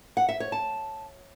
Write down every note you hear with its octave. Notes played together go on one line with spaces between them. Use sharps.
F#5
E5
C#5
A5